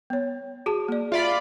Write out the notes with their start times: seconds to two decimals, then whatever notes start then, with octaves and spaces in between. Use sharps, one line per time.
0.10 B3 C#5
0.66 F#4 G#4 A5
0.88 A#3 D5
1.12 F4 D5 E5 B5